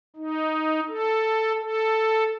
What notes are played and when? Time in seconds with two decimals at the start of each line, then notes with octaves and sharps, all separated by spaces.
0.16 D#4
0.88 A4
1.60 A4